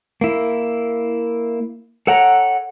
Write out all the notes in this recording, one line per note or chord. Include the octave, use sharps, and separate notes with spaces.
A#3 E4
A4 C#5 F#5 G5 A#5